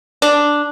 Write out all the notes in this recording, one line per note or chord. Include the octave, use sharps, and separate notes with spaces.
D4